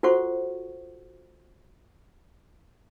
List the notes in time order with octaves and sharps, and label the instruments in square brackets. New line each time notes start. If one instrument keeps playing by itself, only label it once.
[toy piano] F4 F#4 A4 C5 F#5 C#6